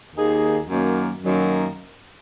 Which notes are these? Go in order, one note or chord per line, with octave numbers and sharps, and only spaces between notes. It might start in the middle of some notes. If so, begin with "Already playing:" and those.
D#2 D#3 A#3 D#4 G#4
F#2 D#3 F#3 A#3
F#2 D#3 F#3 A#3